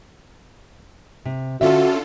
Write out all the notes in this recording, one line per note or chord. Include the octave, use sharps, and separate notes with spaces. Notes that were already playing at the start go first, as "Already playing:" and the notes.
C3
D3 C#4 F4 F#4 A4 E5